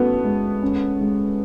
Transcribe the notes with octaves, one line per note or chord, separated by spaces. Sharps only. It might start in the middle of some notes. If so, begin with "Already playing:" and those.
Already playing: A3 B3 C#4 F#4
G#3
C#4
G#3